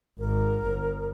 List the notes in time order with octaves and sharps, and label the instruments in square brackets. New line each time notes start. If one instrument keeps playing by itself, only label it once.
[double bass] G#1 [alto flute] A#4
[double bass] G1